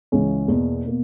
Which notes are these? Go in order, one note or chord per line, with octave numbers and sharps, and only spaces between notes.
C#2 C#3 E3 G#3 C#4
E2 B2 A#3
B2 A#3